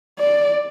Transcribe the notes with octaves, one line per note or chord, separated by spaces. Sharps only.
D5